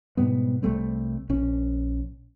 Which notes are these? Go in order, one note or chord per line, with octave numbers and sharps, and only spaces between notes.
G#2 B2 G3 B3
C2 G3 A3 C4
A#1 C#4